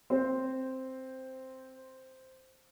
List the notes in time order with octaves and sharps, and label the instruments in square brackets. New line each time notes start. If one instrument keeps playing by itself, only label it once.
[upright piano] C4 [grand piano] C5